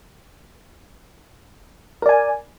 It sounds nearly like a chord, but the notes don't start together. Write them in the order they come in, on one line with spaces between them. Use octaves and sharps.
A#4 D5 G#5